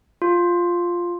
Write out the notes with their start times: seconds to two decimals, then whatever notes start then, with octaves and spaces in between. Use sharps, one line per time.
0.22 F4